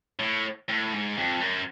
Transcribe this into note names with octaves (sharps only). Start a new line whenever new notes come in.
A2
A2
G#2
F2
F#2